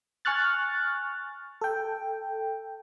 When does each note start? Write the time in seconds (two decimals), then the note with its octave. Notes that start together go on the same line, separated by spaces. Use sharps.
0.25 G#5 C#6 F6 F#6 A6
1.61 A4 G5